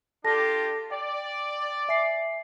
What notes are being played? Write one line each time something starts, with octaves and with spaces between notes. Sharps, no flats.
D4 F4 G4 A4 A5 A#6
D5 G5
E5 G#5 C7